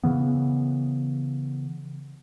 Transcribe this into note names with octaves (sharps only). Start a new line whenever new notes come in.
C#3 E3 B3